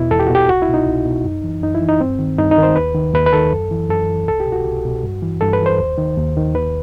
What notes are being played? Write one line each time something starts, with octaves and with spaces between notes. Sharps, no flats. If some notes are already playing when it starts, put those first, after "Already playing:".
Already playing: E2 B2 E4
E2 A4
G4
F#4
B2 G4
C2 F#4
E4
B2
D#4
C2
B2
F#2
E3
F#2 D#4
E4
E3
D#4
G2 C4
D#3
G2 D#4
D#4
D#3
C5
D#2 B4
D#3
D#2 B4
B4
D#3 A4
F#2
E3
F#2 A4
E3
C2 A4
G4
B2
F#4
C2
B2
G2
E3
G2 A4
B4
E3
C5
D#2
D#3
D#2
D#3
D#2 B4